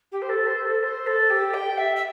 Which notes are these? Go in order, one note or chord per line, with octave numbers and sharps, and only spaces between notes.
G4
C5
A4
C5
A4
C5
A4
G4
G5
E5
E5